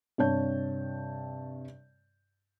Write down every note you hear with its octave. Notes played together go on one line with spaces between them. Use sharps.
G2 C3 C#5 A5 G6